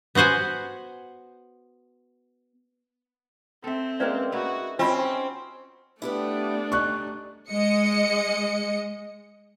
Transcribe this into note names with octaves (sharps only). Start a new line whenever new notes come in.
B3 F#4 C5 F#5 G#5
C4 A4 E5
G#3 A#3 C#4 B4 D5 E5
B3 D#4 E4 F#4
C4 C#4 F4 D#5 B5
A3 B3 D4 E4 G4 B4
G3 C#4 D#4 C#6 F#6
G#3 D#5 C#7